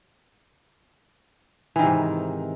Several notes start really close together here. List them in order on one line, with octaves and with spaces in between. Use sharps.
E3 D#3 C3 G#2